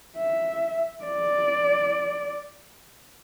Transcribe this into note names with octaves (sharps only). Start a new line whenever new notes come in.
E5
D5